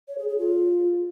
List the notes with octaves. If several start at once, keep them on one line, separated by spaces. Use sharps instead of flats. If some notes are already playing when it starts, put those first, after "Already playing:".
C#5
G#4
G#4
F4